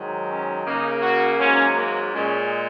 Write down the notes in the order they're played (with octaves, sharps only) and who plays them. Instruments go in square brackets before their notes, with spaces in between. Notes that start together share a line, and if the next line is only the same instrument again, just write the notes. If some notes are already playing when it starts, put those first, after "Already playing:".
Already playing: [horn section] G#2 D#3 F#3
C#4
C#3 A#3 D#4
F#4
G#2 F#3 A#3 C#4
A#3
A#2 G#3 C#4